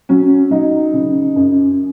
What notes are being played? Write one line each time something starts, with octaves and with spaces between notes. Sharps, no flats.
F#3 C#4
F#3 D#4
C#3
F#2